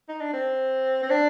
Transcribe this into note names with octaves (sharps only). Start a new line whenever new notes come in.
D#4
D4
C4
C4
D4